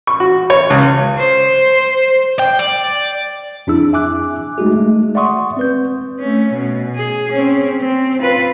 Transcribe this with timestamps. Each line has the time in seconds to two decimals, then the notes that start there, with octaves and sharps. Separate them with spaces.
0.07 C#6
0.20 F#4
0.50 C#5
0.70 C#2
1.19 C5
2.39 G5
2.59 D5
3.67 F2 D4 E4 G#4 E6
3.93 E5 G#5 D6 F#6
4.58 G#3 A3 D#4 F#4 G#4
4.76 G#3 A3
5.15 D5 E5 F#5 C6 C#6 D#6
5.57 C4 B4 G6
6.19 A3 C#4
6.52 B2
6.95 G#4
7.32 C4 C#4
7.80 C4
8.22 F4 B4